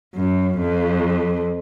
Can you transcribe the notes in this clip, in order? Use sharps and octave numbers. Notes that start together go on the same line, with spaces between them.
F#2
F2